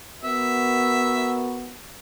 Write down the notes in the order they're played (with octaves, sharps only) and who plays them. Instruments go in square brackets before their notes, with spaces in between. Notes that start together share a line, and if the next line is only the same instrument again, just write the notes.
[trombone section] B3 F#4 A#4 [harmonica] E5